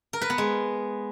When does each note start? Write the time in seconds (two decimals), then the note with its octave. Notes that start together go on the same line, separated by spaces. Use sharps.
0.13 A#4
0.21 B4
0.30 B3
0.38 G#3